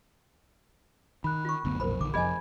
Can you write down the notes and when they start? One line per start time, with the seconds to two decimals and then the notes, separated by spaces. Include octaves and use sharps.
1.24 D#3 B5 F#6
1.45 F4 C#6
1.65 F#1 D2 B3
1.80 B1 F2 A#2 A#4 C5 B5
2.01 A#1 D3 D#3 D6
2.14 F1 F3 G#4 D#5 G#5 B5 G#6